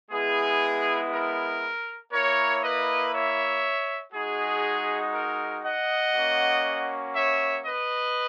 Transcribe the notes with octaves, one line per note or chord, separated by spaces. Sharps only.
G#3 B3 E4 G#4
A#4
A#3 E4 A#4 C#5
B4 D#5
C#5 E5
G#3 D#4 F#4 G#4
A#4
D#5 F#5
A#3 C#4 F#4
C#5 E5
B4 D#5